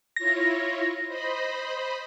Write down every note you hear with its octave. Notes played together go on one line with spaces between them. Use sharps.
E4 F4 C#5 A#6
C5 D#5 B5